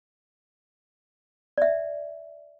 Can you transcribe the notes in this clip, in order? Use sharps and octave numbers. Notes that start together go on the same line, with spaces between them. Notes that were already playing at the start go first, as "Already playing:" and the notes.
D5 E5